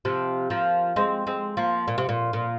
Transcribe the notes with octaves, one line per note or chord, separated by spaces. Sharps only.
C3 F3
F3 A#3
G#3 C4
G#3 C4
F3 A#3
A#2
C3
A#2
A#2